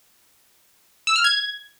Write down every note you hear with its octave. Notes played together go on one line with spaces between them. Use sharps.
E6
F6
G#6